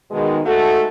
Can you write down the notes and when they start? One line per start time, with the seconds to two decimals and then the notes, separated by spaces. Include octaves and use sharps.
0.11 B2 D#3 G#3
0.45 G#2 A3 F#4 A4